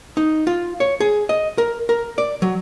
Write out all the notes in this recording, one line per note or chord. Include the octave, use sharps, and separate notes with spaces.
D#4
F4
C#5
G#4
D#5
A#4
A#4
D5
F#3